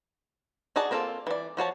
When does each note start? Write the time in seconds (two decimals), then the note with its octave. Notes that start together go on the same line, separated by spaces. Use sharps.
0.76 D#4 F#4 G#4 D5 A5
0.91 A#3 C4 D4 F4 A4
1.27 E3 D5
1.57 F3 F#4 C#5 A5